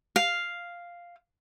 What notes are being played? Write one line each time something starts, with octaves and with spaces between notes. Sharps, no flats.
F5